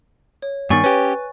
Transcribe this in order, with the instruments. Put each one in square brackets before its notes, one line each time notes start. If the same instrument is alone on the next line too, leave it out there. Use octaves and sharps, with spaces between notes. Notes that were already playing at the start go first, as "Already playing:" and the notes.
[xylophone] C#5
[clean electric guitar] G2 D#3 [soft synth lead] B3 [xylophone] G#5 C#6 A6
[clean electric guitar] C#4 G4 [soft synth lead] B4